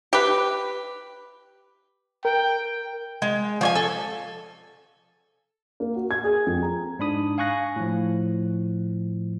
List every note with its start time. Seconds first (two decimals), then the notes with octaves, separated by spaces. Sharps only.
0.13 G4 B4
2.25 A#4 G5
3.22 G#3
3.61 F3 C#5 G#5
3.75 A4
5.80 A#3
5.95 F#4
6.11 G#6
6.24 G#4
6.47 F2
6.62 A#5
6.99 G#2 D4 B5 D#6
7.38 F5 G#5 C#6 F#6 A#6
7.76 A2 F3